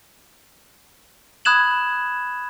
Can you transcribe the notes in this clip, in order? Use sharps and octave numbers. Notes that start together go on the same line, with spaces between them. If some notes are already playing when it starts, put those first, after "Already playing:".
B5 D#6 F#6 G#6 E7 F#7